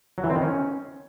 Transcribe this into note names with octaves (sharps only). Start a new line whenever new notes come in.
F#3
E3
C4
D#3
C#4